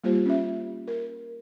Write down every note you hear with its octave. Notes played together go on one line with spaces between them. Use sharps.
G3 A#3 F4 G4 C5
C#4 E5
A#4